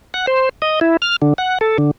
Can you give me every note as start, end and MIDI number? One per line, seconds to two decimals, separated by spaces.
0.14 0.26 78
0.27 0.49 72
0.62 0.80 75
0.81 0.97 64
1.02 1.16 89
1.22 1.34 50
1.38 1.58 78
1.61 1.77 69
1.78 1.91 50